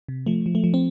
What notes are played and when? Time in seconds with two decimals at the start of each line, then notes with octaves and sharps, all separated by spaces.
0.08 C3
0.26 F3 A3
0.46 F3
0.55 A3
0.64 F3
0.74 C4